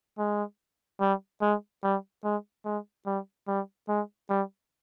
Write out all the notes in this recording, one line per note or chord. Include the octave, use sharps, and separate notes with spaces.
G#3
G3
G#3
G3
G#3
G#3
G3
G3
G#3
G3